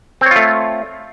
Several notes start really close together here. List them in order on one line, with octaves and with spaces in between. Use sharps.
C4 C#5 F4 A3